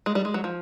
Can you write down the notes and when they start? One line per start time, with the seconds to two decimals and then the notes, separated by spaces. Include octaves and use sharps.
0.06 G#3
0.15 G3
0.25 G#3
0.34 F#3
0.44 F3